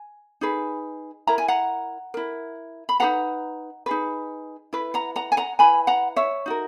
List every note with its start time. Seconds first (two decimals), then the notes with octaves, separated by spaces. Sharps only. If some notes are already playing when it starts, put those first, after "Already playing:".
Already playing: G#5
0.41 D#4 G#4 B4
1.27 E4 A#4 A#5
1.38 G#5
1.48 F#5 A#5
2.14 E4 A#4
2.89 B5
3.00 D#4 G#4 B4 F#5 A#5
3.86 D#4 G#4 B4
4.73 E4 B4
4.94 F#5 A#5
5.16 F#5 A#5
5.32 G#5
5.37 F#5 A#5
5.59 E4 B4 G#5 B5
5.87 F#5 A#5
6.16 C#5 E5
6.46 D#4 F#4 A#4